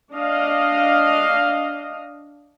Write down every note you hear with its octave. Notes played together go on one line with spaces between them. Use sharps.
D4 D#5 F5